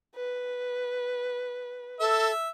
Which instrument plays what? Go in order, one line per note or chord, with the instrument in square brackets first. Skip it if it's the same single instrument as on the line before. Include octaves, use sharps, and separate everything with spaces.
[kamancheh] B4
[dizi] A4 [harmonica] E5